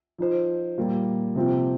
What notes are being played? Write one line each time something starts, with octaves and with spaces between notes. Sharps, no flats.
F3 D#4 C5
A#2 G3 A#3 F4
C3 F3 C4